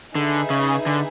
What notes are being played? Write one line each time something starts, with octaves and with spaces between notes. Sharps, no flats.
D3 D#4 G#4 B4 E5
C#3
D3